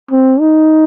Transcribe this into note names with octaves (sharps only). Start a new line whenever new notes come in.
C4
D#4